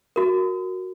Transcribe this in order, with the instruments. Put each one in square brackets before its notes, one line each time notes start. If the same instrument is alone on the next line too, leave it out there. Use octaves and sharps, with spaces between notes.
[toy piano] F#4 A#4